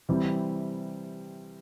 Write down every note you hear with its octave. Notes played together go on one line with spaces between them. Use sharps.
C3 E3 G3